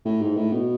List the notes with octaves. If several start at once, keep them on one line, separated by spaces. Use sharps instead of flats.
A2
G#2
A2
B2